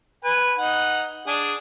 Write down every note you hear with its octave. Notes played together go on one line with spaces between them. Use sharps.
B4 G#5
D#4 F#5
D4 G#4 D#6